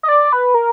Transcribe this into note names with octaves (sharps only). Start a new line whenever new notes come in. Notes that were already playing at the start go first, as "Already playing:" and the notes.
D#5
D5
B4
A#4